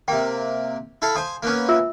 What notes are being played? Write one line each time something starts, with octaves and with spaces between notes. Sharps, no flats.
C3 A#3 G5
E4 A4 F5
C5 F5 G#5 A5 D#6
A#3 B3 C#4
F4 E5 E6